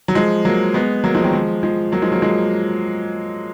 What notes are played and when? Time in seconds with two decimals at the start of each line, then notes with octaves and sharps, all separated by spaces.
0.08 F#3
0.15 F3 G#3
0.45 F#3 A#3
0.74 G#3 B3
1.04 F#3 A#3
1.15 F3 G#3
1.24 D#3 F#3
1.33 F3 G#3
1.63 F3 G#3
1.92 F#3 A#3
2.02 F3 G#3
2.12 F#3 A#3
2.22 F3 G#3